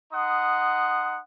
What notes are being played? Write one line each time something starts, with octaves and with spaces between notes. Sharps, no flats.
D#4 F#5 C6 D#6